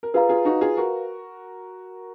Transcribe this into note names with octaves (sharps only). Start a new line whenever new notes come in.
A#4
F4 G#4 B4 F5 A#5
F4 G#4
D#4 F#4
F4 G#4
F#4 A#4